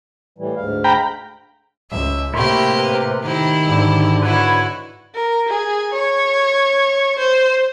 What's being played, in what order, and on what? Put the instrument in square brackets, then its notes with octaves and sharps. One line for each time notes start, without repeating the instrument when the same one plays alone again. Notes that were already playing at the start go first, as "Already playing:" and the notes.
[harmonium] A2 E3 G3
D2 G#2 F5
[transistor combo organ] G5 A#5 B5
[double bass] C#2 [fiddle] E5
[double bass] A2 C3 [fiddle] A#3 G4 [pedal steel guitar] E4 C6 C#6
[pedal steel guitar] A#4 B4
[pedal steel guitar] D#3 [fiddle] E4 G4
[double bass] G#2 D3
[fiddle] E4 F#4 [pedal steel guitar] B4 C#5
[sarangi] A#4
G#4
C#5
C5